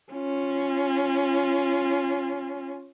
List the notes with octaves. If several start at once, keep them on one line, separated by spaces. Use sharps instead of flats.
C#4 F4